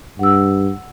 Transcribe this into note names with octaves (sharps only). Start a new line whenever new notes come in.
G2 F#5 E6